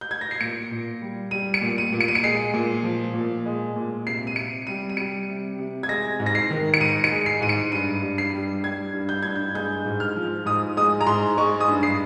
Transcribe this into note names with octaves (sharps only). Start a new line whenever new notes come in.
G6
G#6
A#6
C7
A#2 C#7
A#2
G3
G3 D#7
C#7
A#2
D#7
A#2
C#7
D#7
C#7
G#3 C7
A#2
F3
A#2
G#3
A#2
C3 C7
D#7
C3 C#7
G3 D#7
D#7
G3 C#7
C3
C3
G#6
G#3 A#6
G#2
A#6
C7
D#3
C#7
G#2 D#7
C#7
G#3
C7
G#2 D#7
C#7
G2 D#7
G2
C7
G3
G3 G#6
G2
G6
G2 G#6
G6
G#3 G6
G#2
F6
F3
G#2 D#6
G#3 D#6
A#5
G#2 C6
G#3 C#6
D#6
G2
C7